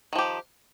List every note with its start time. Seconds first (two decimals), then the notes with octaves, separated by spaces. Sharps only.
0.13 D#3
0.16 F3
0.19 G4